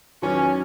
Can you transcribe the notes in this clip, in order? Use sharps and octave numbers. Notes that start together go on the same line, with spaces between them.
E2 D#3 F#3 B3 C#4